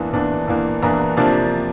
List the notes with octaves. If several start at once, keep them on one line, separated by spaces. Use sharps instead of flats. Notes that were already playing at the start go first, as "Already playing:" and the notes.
Already playing: E2 E3 A#3 D4
E2 E3 A#3 D4
E2 E3 A#3 D4
E2 E3 A#3 D4 A#5
C3 F3 A#3 D4 A5